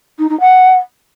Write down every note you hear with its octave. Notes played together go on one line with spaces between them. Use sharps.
D#4
D#4
F#5